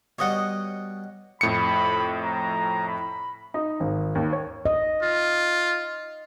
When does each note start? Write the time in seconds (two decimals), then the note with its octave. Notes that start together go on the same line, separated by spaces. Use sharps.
0.19 B2 G3 C#5 D#5 F#5
1.41 F2 A2 B5 C#7
2.23 A#5
2.87 B5
3.54 D#4
3.80 G#1
4.15 D#2
4.33 C#5
4.66 D#5
5.02 F4